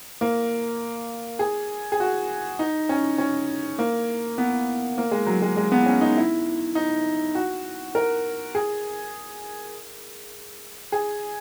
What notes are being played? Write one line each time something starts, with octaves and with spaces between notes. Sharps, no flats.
A#3
G#4
G#4
F#4
D#4
C#4
C#4
A#3
B3
A#3
G#3
F#3
G#3
G#3
B3
C#4
D#4
E4
D#4
F#4
A#4
G#4
G#4